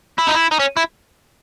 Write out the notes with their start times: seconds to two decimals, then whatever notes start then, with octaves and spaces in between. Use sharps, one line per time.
0.19 E4
0.28 D#4
0.35 E4
0.51 D#4
0.60 C#4
0.77 E4